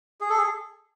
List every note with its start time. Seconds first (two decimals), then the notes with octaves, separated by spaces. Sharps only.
0.21 G#4
0.30 A4
0.38 G#4